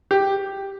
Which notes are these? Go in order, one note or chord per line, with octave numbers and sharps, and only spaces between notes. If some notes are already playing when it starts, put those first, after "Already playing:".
G4